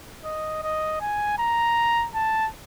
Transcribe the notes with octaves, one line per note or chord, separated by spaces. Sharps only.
D#5
D#5
G#5
A#5
A5